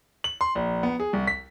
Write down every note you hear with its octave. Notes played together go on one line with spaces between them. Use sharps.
F#7
C6
A#1
B3
G#4
C2
B6